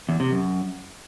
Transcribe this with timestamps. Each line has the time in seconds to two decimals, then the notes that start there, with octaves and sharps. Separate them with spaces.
0.09 E2
0.20 C3
0.31 F#2